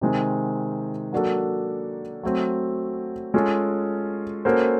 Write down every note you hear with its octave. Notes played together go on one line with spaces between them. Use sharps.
C3 D#3 G#3 C4
F#3 A#3 D4 F#4 A4
F#3 A3 C4
G#3 C#4 F4 A4
A#3 C#4 F#4 A4 C5